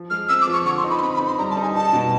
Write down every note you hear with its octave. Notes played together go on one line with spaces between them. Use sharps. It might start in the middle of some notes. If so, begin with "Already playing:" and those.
Already playing: F3
G#3 F6
C4 E6
D6
F3
C#6
D3 C#6
C6
D#4
B5
C6
C4 B5
B5
D#4
C6
G3 A#5
A5
D#4
G#5
D#4 A5
B2